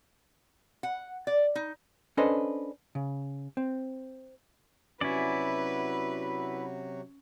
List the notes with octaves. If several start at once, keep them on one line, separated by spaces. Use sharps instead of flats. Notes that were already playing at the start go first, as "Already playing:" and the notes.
F#5
D5
D#4
C#4 D4 A4 B4 C5 D#5
C#3
C4
C3 F#3 C#4 E4 F#4 B4 D5